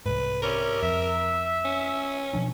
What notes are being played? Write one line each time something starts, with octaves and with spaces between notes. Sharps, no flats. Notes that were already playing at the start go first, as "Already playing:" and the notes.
C2 G#2 B4
C3 G3 C#4 A#4
F2 E5
C#4
B2 F3 D4